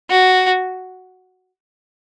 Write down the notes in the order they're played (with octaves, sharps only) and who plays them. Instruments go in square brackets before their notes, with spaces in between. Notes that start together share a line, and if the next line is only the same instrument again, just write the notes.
[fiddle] F#4